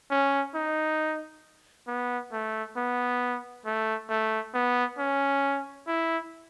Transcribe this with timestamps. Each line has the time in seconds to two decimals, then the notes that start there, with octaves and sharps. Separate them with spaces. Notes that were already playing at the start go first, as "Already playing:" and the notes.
0.11 C#4
0.55 D#4
1.87 B3
2.33 A3
2.77 B3
3.66 A3
4.09 A3
4.54 B3
4.98 C#4
5.87 E4